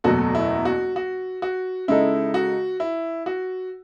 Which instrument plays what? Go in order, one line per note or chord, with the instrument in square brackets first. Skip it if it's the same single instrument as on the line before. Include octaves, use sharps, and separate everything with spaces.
[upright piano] F#1 E2 B2 F#3 A3 [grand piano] F#4 A4
[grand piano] E4
F#4
F#4
F#4
[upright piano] C#3 G#3 D#4 A4 [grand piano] E4
[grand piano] F#4
E4
F#4